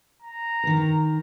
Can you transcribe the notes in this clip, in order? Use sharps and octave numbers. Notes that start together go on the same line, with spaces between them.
A#5
D#3 A#4